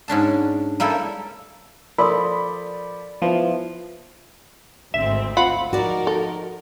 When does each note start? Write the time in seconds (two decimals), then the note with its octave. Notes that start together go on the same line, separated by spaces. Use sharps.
0.08 G#2 C#4 D4 A5
0.80 G3 A#3 E4 G4 A4
1.98 F3 A4 A#4 D5 B5 C6 D#6
3.22 F3 B3 E4
4.94 G#1 D2 C4 E5
5.37 F4 F#5 B5
5.73 F3 D#4 F#4 A#4 D5
6.07 A4